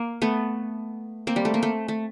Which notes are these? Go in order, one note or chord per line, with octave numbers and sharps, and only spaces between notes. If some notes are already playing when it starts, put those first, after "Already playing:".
Already playing: A#3
A3 B3
A#3 C4
G3
A3
A#3
A3
A3